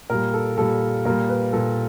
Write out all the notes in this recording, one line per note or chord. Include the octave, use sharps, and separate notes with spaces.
A#2 G3 A#4
A4
A#2 G3 A4
A#2 G3 A#4
B4
A#2 G3 A4